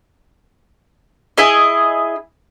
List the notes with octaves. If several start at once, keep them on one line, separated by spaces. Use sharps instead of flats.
E4 G#4 D#5